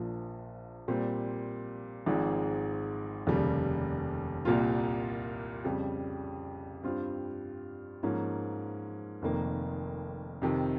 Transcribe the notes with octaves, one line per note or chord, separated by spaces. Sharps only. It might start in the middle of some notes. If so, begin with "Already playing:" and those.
Already playing: A#1 A#2 F3
A#2 G3 C4
G#1 G#2 F3 G#3
F1 D#2 C#3 G3
C2 A#2 G3 A#3 F4
F2 C#3 G3
G2 G3 C4 F4
G#2 F3 A#3 C#4
F1 F2 D#3 A#3
F2 C3 D#3